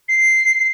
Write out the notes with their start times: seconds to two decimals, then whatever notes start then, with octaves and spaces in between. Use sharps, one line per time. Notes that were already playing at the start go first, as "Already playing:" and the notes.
0.09 C7